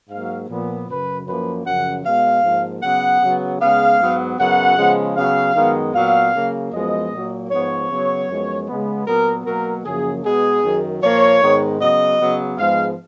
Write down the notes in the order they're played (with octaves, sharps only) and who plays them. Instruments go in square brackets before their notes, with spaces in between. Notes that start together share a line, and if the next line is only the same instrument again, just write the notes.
[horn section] G#2 F#3 A#3 F5
A#2 F3 B3
F#2 C#3 F#3 B4
F#2 F3 A#3 B4
F#2 C#3 F3 F#5
B2 G#3 B3 F5
G#2 F3 A#3
C#3 F#3 B3 F#5
C#3 F#3 B3
C#3 G#3 B3 F5
G#2 F#3 B3
F#2 C#3 F#3 B3 F#5
C#3 F3 G#3 B3
C#3 F#3 B3 F5
F#2 D#3 G#3 B3
A#2 F#3 B3 F5
C#3 F#3 A#3
F#2 F3 G#3 B3 D#5
A#2 F#3 A#3
G#2 F3 B3 C#5
C#3 F#3 B3
F#2 F3 G#3 B3
C#3 G#3 B3
A#2 F#3 B3 A#4
B2 F#3 A#3 A#4
F#2 C#3 F3 A#3 G#4
B2 G#3 B3 G#4
F#2 D#3 F#3
A#2 F3 A#3 C#5
G#2 D#3 G#3 B3
C#3 F#3 B3 D#5
C#3 F#3 B3
G#2 F3 G#3 B3 F5